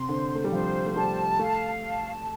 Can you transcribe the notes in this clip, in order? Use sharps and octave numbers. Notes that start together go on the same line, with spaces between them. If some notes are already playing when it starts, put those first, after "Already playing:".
Already playing: C3 C6
D3 C5
A3
G3
F3 C5
A3
G3 A5
A3 F5
A5